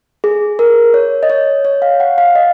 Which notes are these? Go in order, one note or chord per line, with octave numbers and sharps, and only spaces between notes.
G#4
A#4
C#5
D#5
C#5
C#5
F5
F#5
F5
D#5